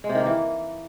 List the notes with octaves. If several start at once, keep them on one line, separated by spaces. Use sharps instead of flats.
G#3
C3
D#3
A#3
E3